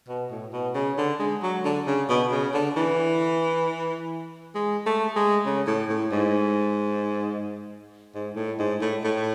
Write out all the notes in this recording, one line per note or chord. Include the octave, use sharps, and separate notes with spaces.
B2
A2
B2
C#3
D3
G#3
F#3
D3
C#3
B2
C#3
D3
E3
G#3
A3
G#3
C#3
A2
A2
G#2
G#2
A2
G#2
A2
A2